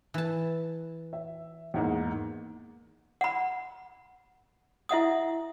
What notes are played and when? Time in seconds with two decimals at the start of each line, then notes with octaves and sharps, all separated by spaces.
0.14 E3 A5
1.13 E5
1.74 E2 G#2 A#3
3.21 F#5 B5
4.89 E4 E5 F#5 D#6